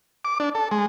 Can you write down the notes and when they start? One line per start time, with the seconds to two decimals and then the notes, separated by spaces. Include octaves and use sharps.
0.25 D6
0.40 D4
0.55 A4
0.71 G#3